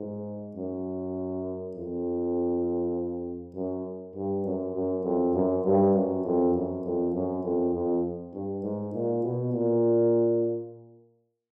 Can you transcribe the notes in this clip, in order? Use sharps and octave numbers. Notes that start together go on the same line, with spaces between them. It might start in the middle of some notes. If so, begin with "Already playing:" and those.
Already playing: G#2
F#2
F2
F#2
G2
F#2
F#2
F2
F#2
G2
F#2
F2
F#2
F2
F#2
F2
F2
G2
G#2
A#2
B2
A#2